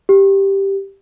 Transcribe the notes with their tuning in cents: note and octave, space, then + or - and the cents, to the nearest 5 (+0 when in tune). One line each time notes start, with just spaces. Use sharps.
G4 +0